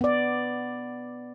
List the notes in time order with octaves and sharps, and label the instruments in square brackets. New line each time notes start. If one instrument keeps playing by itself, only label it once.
[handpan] B3 D5